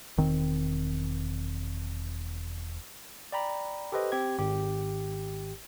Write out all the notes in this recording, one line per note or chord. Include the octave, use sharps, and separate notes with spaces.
E1 D#3 C4
D5 G5 A#5 B5
G4 A4 B4 C5 D#5
C4 G4 G#6
G#1 G4